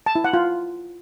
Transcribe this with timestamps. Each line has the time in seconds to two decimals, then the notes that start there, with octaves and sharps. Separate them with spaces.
0.06 A5
0.15 E4
0.24 F#5
0.33 F4